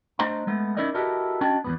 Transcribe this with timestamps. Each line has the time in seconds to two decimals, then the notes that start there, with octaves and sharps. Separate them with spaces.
0.19 A3 D4 C5 D#5 A#5 C6
0.47 G#3 A3 B3
0.77 C#4 D#4 E4 A#4 D5 D#5
0.94 E4 F#4 G4 A4 A#4 D#5
1.41 C#4 D4 F#4 D#5 G5 A5
1.64 E2 G#2 B3